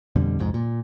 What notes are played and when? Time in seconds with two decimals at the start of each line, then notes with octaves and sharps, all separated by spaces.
0.16 F2 B2 D3 G3
0.39 C2 F2 G#2
0.54 A#2